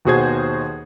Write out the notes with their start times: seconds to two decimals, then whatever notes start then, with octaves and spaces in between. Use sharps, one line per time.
0.05 D#2 B2 F#4 G#4 C5 G#6